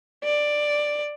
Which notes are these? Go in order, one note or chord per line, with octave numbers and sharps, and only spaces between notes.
D5